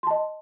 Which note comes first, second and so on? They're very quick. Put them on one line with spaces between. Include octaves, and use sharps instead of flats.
C6 A5 D#5